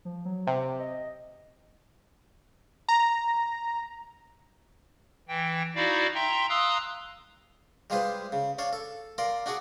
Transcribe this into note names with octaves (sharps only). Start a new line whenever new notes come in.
F3
F#3
C3 C5
D#5
A#5
E3 G5
D#4 E4 F#4 D5 F5
E5 G5 A#5 C6
F5 A#5 C6 D#6 E6 F#6
G3 G#3 F4 G#4 B4 C5
C#3
D4 C#5 F5 A5
A4
A#4 D5 F5 C6
D4 F#4 G#4 D5 C#6 D6